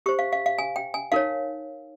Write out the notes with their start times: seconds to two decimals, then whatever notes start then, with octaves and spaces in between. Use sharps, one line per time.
0.06 G4 C5 C#6
0.19 F5
0.33 F5
0.46 F5
0.58 G#5
0.76 G5
0.94 G#5
1.12 D#4 A#4 C#5 F5